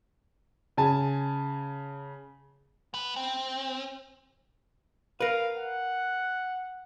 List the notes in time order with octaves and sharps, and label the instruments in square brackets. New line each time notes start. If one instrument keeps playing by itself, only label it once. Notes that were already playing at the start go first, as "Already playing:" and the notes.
[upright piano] C#3 G#5 A5
[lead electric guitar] B3 B4
C4
[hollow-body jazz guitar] A#4 B4 [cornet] F5
[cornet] F#5